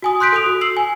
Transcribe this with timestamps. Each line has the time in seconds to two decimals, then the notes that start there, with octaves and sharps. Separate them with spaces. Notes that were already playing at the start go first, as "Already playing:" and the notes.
0.02 F#4 G#5 D#6
0.20 C6 F#6 G6 B6 D7
0.33 A4 D#6 F7
0.46 F#4
0.61 E6 C7 F#7
0.77 G#5